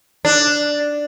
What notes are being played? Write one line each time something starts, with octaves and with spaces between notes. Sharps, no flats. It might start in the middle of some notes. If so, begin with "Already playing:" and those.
D4